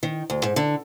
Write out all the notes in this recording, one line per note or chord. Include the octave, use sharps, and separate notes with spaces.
D#3
D2
G#2
D3